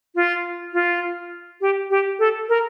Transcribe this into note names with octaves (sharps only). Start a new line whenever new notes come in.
F4
F4
G4
G4
A4
A#4